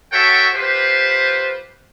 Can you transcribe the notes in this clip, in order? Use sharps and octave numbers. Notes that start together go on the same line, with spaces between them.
F#4 A4 C#5 E5 F#5 G5
F4 G4 B4 C5